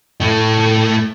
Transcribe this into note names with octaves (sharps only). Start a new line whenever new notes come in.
A2 A3